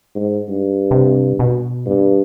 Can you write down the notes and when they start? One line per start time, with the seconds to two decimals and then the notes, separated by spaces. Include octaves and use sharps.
0.15 G#2
0.49 G2
0.91 C3
1.39 B2
1.86 G2